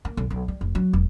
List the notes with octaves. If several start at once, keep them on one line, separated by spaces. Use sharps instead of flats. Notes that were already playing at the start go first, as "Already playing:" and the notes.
A#3
B1
B1
G3
F1
F#3
E1